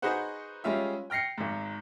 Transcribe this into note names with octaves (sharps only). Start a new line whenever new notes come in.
D#4 F#4 G#4 B4 C5 F#5
G3 G#3 C#4 F4 E5
G5 F6 A#6 C7 C#7
G#1 G#2